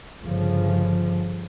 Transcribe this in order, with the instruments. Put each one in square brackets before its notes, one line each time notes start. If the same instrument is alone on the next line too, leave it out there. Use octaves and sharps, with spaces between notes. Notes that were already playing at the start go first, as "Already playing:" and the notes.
[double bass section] G1 C#3 F3